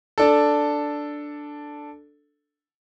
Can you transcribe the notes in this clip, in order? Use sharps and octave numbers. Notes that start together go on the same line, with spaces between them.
D4 A4